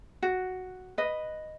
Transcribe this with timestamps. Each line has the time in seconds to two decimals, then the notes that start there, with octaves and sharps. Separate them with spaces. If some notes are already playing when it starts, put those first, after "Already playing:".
0.22 F#4
0.98 B4 D#5